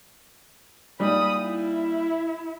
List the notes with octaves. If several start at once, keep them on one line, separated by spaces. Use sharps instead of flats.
A#2 G3 D#4 B5 D#6
E4